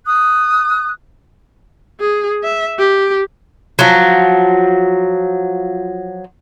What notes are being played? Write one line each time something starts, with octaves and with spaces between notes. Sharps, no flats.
D#6 F#6
G#4
E5
G4
F3 F#3